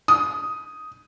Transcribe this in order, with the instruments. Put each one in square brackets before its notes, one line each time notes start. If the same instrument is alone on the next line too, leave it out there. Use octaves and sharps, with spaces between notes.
[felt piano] D#6